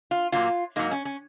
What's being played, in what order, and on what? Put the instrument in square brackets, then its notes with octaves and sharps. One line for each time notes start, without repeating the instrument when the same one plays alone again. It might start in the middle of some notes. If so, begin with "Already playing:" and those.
[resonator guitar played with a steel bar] F4
A#2 F#3 A#3 F4
G#2 F#3 A#3 D#4
C#4
C#4